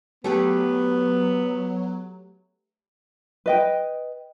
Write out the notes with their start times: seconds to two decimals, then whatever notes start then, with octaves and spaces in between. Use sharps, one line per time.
0.24 F#3 A3 B3 G4 B4
3.46 B4 D#5 G5